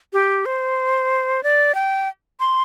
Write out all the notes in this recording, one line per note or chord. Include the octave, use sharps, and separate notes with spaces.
G4
C5
D5
G5
C6